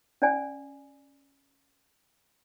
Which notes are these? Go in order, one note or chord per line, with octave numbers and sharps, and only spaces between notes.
C#4 D5 G#5